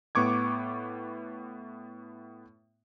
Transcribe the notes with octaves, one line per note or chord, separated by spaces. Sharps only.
A2 B3 C#6 D6 G#6